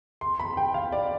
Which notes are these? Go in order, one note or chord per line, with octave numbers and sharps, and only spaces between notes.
C6
B5
G5
F5
D5